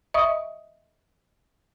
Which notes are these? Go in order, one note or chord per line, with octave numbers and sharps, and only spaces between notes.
D#5 E5 C#6 D#6